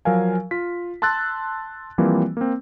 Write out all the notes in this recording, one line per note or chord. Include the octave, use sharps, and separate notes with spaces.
F3 F#3 A#4 F5 G#5
F4 B6
A5 C6 E6 F#6 A6
E3 F3 G3 A#3 C4
A#3 C4